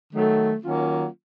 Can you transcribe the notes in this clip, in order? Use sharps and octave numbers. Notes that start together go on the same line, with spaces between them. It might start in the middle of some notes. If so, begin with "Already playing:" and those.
D#3 F#3 A3
D#3 F#3 A#3 C#4 F4